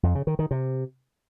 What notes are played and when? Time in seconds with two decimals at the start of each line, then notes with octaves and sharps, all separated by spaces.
0.03 F2
0.15 C#3
0.27 D#3
0.39 D#3
0.51 C3